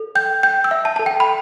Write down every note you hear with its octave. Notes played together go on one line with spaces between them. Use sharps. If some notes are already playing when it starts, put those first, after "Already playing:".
Already playing: A4
G5 G6
G5 G6
E6
E5
A5
A4 A5
G5
B5